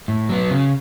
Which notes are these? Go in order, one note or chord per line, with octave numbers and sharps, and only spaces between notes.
A2
F#3 B3
C#3